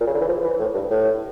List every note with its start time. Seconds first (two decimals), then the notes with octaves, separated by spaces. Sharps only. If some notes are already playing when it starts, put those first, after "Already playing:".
0.01 A#2
0.07 C#3
0.14 D3
0.21 E3
0.28 F3
0.44 E3
0.59 A2
0.74 G2
0.90 A2